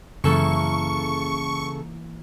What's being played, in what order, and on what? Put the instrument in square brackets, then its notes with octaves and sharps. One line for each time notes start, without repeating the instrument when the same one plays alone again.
[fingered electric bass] F#2 [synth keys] C#3 A4 [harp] E3 A#3 [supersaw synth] C#6